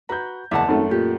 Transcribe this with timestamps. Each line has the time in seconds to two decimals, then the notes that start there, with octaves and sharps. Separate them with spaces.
0.09 F#4 B4 A#5 G6
0.51 F#1 E2 E5 F#5 A5
0.68 G#1 F#2 A3
0.91 A#2 G4